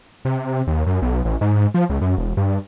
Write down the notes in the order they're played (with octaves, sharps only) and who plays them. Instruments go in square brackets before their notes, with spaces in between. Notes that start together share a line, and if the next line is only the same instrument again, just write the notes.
[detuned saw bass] C3
D#2
F#2
B1
A1
G#2
F3
C#2
F#2
E1
G2